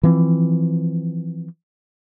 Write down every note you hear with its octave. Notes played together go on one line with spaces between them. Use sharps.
E3 F3 C4